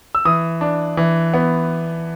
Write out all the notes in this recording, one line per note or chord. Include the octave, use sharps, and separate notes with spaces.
E6
E3 D#6
D4
E3
B3